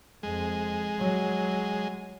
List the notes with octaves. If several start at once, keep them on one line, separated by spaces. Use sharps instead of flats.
F2 G#3
F#3